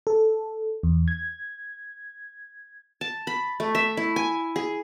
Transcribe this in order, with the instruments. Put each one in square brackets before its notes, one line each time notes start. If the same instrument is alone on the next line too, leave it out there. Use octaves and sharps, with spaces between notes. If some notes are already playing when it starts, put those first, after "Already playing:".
[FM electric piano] A4
E2
G#6
[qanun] A5
B5
A3
E5
E4
G#5
G#4